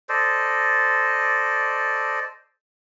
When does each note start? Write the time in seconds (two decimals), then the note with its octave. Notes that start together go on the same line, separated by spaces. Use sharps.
0.09 A4 C5 D5 D#5